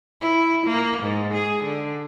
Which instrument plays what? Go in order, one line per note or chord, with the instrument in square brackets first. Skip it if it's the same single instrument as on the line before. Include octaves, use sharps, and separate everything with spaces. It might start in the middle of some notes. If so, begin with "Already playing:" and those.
[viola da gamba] E4
A#3
G#2
G#4
D3